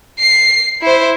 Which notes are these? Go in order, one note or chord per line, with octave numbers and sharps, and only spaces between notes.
C7
E4 C5